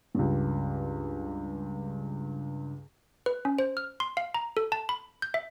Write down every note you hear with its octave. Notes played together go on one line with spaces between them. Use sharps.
C#2 G2
B4
C#4
C5
F6
C6
F5
A#5
A4
A5
B5
G6
E5